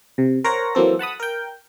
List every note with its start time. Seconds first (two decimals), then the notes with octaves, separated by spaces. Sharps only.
0.18 C3
0.44 A#4 C5 C#5 F#5 A#6
0.75 E3 F#3 A#3 C4 A4
0.99 F#5 A5 B5 D#6
1.20 A#4 G5